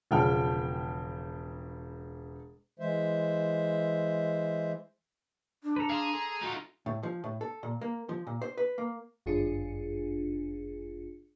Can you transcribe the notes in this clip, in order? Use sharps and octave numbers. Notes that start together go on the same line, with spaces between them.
E1 C#3 F3 G5 A5 F6
E3 G#3 C5 E5
D4
A4 B4 A#5
G#4 F5 A5 C6
A4 G#5 C6
D#4 F4 F#4
A2
F3
A2
A4
A#2
A#3
F3
A#2
C5
B4
A#3
G1 F#2 D4 F4 G#4 C#7